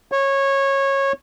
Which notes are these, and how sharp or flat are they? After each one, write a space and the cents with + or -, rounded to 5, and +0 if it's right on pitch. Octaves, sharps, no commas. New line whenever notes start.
C#5 -20